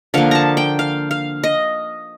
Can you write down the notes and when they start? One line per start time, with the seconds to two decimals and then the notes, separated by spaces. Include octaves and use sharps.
0.14 D3 F3 A#3 F5
0.31 A5 A#5
0.57 G5
0.79 F5
1.11 F5
1.44 D#5